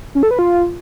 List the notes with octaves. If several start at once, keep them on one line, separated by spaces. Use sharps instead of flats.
C#4
A4
B4
F4